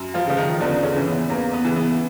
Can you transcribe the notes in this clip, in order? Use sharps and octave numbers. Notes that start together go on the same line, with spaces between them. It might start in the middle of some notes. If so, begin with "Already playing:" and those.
Already playing: F#2
F3 F4
C#3 F3
D#3 D#4
E2 D3 D4
D4
C#3 C#4
C#3 E3
B3
E2 A#3
B3
C#3 E3
B3